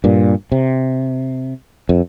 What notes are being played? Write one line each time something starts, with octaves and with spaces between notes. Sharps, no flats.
G2 A#2
C3
F2